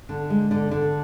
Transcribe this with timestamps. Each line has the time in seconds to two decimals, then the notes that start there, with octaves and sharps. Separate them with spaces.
0.09 D3
0.30 G#3
0.51 D3
0.71 D3